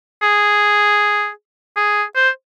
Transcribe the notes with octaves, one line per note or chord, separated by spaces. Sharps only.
G#4
G#4
C5